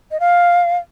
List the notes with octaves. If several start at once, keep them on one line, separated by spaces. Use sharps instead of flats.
D#5
F5